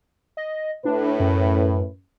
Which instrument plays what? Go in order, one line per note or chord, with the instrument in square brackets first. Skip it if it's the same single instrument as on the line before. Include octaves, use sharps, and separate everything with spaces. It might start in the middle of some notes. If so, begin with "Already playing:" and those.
[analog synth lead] D#5
[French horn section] A2 B4 [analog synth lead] D4
[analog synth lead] F#2